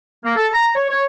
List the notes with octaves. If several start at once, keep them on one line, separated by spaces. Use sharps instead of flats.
A#3
A4
A#5
C#5
C#5